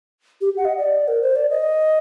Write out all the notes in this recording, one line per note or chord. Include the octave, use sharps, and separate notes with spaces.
G4
F#5
D#5
D5
A#4
C5
D5
D#5